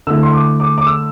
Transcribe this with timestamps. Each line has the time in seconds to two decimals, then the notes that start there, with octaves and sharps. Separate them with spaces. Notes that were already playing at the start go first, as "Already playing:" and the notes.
0.07 D3 A3 E4 E6
0.23 C6
0.33 D6
0.60 D6
0.78 D6
0.87 E6